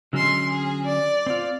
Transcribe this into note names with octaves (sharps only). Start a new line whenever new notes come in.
D3 F#3 G#3 C#4 C6
G#4
D5
C4 F4